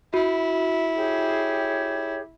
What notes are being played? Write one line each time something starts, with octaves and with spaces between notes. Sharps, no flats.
E4 F#4
G4 G#4 C#5